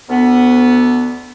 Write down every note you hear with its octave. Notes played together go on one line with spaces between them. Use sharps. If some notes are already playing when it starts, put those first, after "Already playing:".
D2 B3